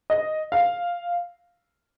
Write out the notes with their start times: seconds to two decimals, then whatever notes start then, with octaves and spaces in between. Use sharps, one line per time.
0.10 D#5
0.52 F5